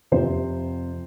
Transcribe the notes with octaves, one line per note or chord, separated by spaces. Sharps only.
F2 C3 F3 C5